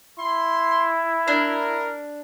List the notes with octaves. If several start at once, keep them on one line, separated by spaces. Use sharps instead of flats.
E4 C6
D4 A#4